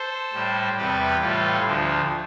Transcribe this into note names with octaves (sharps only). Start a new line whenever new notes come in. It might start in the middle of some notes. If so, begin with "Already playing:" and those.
Already playing: A4 C5
A2 G3
E2 C3 G3 G4 B4
A2 E3 G3 F4 A4
D2 D3 F3